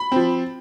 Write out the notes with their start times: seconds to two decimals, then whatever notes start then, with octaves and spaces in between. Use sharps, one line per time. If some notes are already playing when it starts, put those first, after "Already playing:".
Already playing: B5
0.12 F3 C4